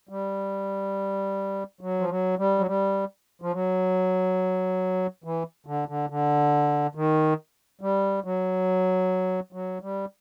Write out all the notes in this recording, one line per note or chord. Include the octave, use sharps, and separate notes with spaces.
G3
F#3
F3
F#3
G3
F#3
G3
F3
F#3
E3
D3
D3
D3
D#3
G3
F#3
F#3
G3